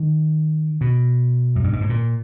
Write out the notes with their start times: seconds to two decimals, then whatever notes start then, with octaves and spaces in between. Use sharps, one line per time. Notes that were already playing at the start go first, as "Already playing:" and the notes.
Already playing: D#3
0.81 B2
1.55 F#2
1.64 G2
1.73 G#2
1.81 A2
1.89 A#2